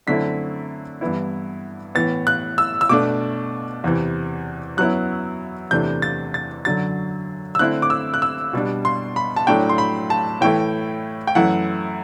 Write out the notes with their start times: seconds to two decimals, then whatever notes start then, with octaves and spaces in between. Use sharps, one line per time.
0.07 F#2 D3 A3 C4 E4 B6
1.01 G2 E3 B3 E4
1.95 A2 E3 B3 A6
2.27 F#6
2.58 E6
2.81 E6
2.89 B2 A3 D4 D6
3.84 E2 C3 E3
4.77 F#2 F#3 B3 E4 F#6
5.71 E2 C3 E3 A3 D4 G6
6.02 A6
6.34 A6
6.65 F#2 D3 F#3 A6
7.55 E6
7.59 D3 A3 C4 E4 F#6
7.82 D6
7.90 E6
8.14 F#6
8.22 E6
8.53 B2 G3 D4
8.85 C6
9.16 B5
9.36 A5
9.47 A2 F#3 A3 D4 G5
9.69 C6
9.78 B5
10.10 A5
10.41 A2 E3 A3 E4 G5
11.27 G5
11.35 F#2 E3 A3 E4 F#5